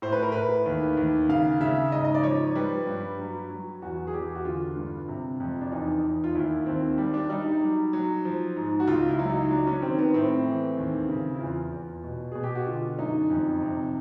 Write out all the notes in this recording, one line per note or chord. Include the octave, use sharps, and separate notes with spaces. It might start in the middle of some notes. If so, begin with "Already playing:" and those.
A2 C5
B4
A#4
A2 B4
D#2
D#2
C#3 F5
C#3 E5
G#2 D#5
D#5
D5
F3 C#5
G3 B4
G2
F#3
F#3
E2 F#4
G#4
E2 G4
F#4
D3 F4
G2
C3
F2
D4
E2 D#4
E2
F4
D#2 E4
D#2 C4
G3
D4
G3 D#4
D#4
F#3
F#3
F3
G#2
F#4
C#2 F4
E4
F#3
D#4
F#3 D4
C#4
D#3 C4
B3
A2 C4
E3
D#2
C#3
E4
E2 F4
E2
B2
B2 G#4
G4
F#4
D3 F4
F#2 D#4
F2
C3